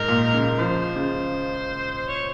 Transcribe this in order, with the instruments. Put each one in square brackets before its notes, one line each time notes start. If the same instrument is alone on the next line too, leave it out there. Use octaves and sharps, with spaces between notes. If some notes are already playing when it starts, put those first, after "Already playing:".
Already playing: [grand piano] G#2 [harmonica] A#4
[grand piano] A#2
C#3
[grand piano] F3 [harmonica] C5
[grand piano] C#3
[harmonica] C#5